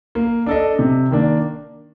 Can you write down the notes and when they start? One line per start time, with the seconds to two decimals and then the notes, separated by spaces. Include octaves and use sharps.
0.15 A#3
0.46 D4 A4 D#5
0.79 C3
1.11 D#3 A#3 D4